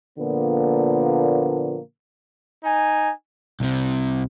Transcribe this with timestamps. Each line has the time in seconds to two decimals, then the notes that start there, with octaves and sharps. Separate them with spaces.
0.19 A#2 D3 F3 A#3 B3
2.63 D#4 G#5
3.60 C2 C3